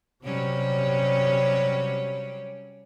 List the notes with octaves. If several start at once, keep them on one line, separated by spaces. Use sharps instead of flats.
C3 F#3 G3 C#4